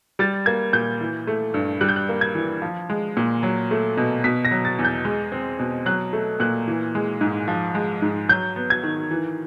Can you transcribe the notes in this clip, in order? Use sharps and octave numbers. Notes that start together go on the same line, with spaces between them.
G3 A6
A#3 G#6
A#2 G6
E3
A3
G2
G3 F#6
G6
F#6
A#3
G#6
E3
F3
G#3
A#2
F#3
A3
B2
B2 B6
A#6
F#3
A6
E2
G6
G#3
C4
B2
F#3 F#6
A3
A#2 F#6
E3
G#3
G#2
F3
G#3
G#2
F#3 G6
B3
G#6
D#3
E3